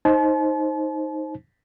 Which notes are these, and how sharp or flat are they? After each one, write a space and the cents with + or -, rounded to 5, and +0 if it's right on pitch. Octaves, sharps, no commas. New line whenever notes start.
D#4 +10 C5 +15 A5 -40